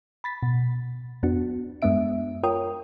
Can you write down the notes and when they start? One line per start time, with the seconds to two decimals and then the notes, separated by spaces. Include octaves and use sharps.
0.24 B5 A6 B6
0.43 B2
1.23 F2 B3 D4 F#4
1.82 F#2 G#3 B3 D4 E5 D7
2.43 F4 A#4 C#5 G5 D#6